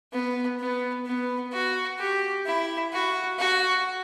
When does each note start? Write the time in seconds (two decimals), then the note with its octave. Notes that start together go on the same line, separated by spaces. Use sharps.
0.13 B3
0.60 B3
1.06 B3
1.53 F#4
1.99 G4
2.46 E4
2.92 F#4
3.39 F#4